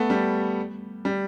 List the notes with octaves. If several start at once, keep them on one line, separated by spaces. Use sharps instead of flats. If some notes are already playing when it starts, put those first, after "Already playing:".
Already playing: A3 B3
G3
G3